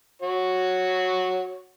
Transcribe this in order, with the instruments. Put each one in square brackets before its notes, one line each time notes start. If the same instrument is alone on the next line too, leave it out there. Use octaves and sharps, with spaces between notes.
[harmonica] F#4 C#5